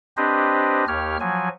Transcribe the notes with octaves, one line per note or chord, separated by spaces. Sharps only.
C4 D4 G4 B4 C5 D#5
D#2 G4 C#5 F6
F3 F#3 G#5